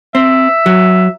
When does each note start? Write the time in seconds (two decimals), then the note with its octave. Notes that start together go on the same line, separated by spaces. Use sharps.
0.15 C4 E5
0.66 F#3